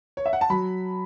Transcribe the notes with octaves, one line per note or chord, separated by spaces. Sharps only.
C#5
E5
F#5
A5
F#3 B5